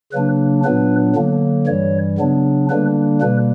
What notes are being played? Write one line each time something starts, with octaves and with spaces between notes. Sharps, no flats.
C#3 F#3 A#3 D4 B4
A#2 F#3 B3 D4 B4
D3 F#3 A#3
G2 E3 G3 C#5
C#3 F#3 B3 D4
D3 G3 A#3 D4 B4
B2 G3 A#3 B4